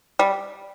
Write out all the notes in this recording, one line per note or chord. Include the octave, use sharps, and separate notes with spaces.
G3